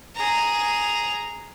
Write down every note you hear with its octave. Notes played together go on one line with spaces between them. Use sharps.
G#4 A#5